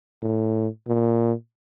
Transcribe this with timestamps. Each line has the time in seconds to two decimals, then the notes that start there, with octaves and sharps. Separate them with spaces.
0.22 A2
0.87 A#2